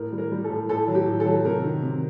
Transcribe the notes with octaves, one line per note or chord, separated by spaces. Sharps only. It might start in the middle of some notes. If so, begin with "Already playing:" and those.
Already playing: A2 A#4
G3
A#4
G3
A4
A2
A2 A4
F#3
G4
A2
A4
F#3
C3 A#4
D#3
C3